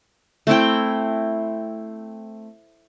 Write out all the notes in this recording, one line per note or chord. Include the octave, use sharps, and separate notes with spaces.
A3 C4 E4 G5